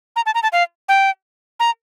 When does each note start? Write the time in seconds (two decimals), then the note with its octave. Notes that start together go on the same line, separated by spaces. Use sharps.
0.16 A#5
0.26 A5
0.35 A#5
0.43 A5
0.52 F5
0.89 G5
1.60 A#5